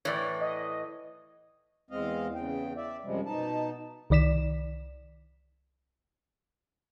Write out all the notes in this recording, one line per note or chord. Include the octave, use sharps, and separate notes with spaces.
A2 E3 C#5 D5
D#5
E2 G#3 C4 D#5 F5
E2 C#3 G5
D5 E5
F#2 C3 F3 G3 G#3
B2 D#4 A5
C2 D#3 D5 B6 E7